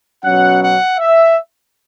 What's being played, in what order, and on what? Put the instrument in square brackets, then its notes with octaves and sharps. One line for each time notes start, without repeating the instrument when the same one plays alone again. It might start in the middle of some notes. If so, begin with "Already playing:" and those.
[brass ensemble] B2 F#3 C#4 F#5
F#5
E5